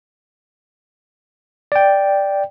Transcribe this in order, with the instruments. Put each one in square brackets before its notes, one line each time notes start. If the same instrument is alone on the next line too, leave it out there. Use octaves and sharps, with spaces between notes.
[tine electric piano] D5 G5